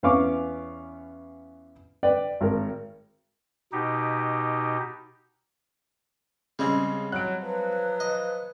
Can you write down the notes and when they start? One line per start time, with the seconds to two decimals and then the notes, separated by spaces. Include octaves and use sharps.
0.03 E2 B3 C#4 F5 C#6 D6
2.03 B4 D5 G5
2.41 G#1 A#4
3.73 B2 D#4 G4
6.59 C#3 G3 G#3 C4
7.12 F#3 F#6 D7
7.42 F3 F#3 B4
8.00 D#5